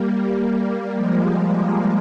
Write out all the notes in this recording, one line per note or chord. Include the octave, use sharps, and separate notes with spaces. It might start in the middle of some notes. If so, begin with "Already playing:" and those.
Already playing: G3 A#3
G3 A#3
F3 G#3